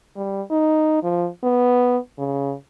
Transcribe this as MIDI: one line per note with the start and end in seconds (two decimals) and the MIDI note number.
0.16 0.42 55
0.50 1.02 63
1.03 1.28 53
1.43 1.98 59
2.18 2.54 49